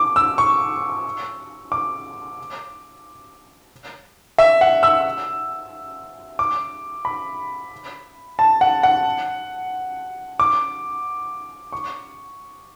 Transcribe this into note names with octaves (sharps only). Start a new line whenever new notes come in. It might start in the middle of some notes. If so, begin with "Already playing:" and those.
Already playing: D6
E6
C#6
D6
E5
F#5
E6
D6
B5
A5
F#5
F#5
D6
C#6